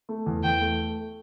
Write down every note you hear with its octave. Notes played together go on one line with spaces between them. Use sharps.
A3
E2
E2 G5
A3